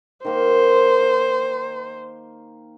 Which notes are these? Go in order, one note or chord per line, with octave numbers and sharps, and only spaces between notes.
D#3 A#3 C5